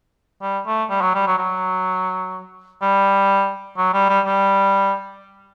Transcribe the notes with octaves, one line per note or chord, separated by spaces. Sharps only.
G3
A3
G3
F#3
G3
F#3
F#3
G3
F#3
G3
G3
G3